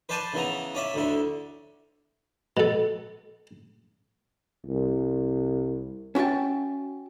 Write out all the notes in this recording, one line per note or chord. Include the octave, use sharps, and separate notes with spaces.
B4 C5 D5 G#5 A5
C#3 E3 B3 A#5
C#4 D5 E5
D2 D3 E4
B2 A4
C2
C#4 F#4 E5 G5 A5